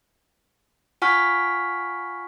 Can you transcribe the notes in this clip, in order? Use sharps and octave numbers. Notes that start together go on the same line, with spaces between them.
F4 F#5 G#5 C#6 F6 B6